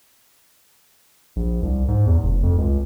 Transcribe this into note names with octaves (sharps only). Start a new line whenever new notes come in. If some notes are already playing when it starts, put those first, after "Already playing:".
A#1
C2
G#2
E2
F1
F2
C#2